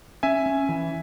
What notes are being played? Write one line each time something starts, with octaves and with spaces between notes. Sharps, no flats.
C#4 E5 G#5
C#4
E3